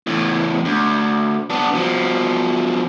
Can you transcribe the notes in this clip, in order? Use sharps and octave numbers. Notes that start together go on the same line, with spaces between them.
E2 A2
D2
B3 D4
B2 F3